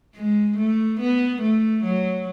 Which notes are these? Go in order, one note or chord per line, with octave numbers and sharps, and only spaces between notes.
G#3
A3
B3
A3
F#3